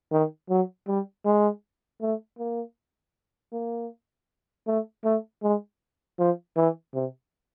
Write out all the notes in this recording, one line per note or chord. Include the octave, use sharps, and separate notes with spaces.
D#3
F#3
G3
G#3
A3
A#3
A#3
A3
A3
G#3
F3
E3
C3